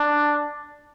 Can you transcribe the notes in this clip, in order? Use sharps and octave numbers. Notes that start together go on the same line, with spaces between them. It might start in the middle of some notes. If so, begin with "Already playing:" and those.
Already playing: D4